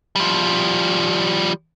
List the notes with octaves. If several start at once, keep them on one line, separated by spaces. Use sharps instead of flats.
F3 G3